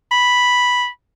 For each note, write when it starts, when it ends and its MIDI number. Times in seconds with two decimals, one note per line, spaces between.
0.11 0.87 83